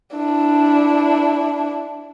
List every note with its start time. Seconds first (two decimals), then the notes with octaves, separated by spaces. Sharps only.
0.16 D4 E4